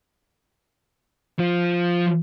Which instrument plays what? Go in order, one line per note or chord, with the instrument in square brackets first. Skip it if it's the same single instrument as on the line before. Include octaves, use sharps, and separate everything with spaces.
[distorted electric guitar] F3 F4